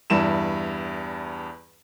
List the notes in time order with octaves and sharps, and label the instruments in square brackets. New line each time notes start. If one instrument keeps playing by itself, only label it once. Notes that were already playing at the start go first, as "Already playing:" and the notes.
[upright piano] E2 G2 E4 E7